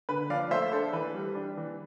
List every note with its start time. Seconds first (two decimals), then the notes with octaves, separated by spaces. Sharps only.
0.09 D3 B4
0.30 F3 D5 F5
0.51 A3 C5 E5
0.72 D4 A4 C5
0.93 E3 B4
1.14 G3
1.35 D4
1.57 E3